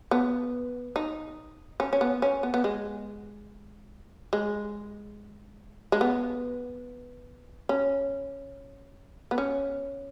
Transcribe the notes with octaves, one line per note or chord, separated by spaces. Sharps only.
B3
D#4
C#4
C#4
B3
C#4
B3
B3
G#3
G#3
G#3
B3
C#4
B3
C#4